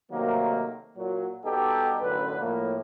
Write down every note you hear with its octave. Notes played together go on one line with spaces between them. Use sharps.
C3 D#3 F#3 A3 A#3
A#2 F#3
G3 B3 D#4 F#4 G4 A4
A1 F#2 D3 B4
A2 F3 A#3